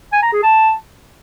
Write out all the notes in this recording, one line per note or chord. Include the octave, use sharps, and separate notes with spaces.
G#5
A#5
G#4
A5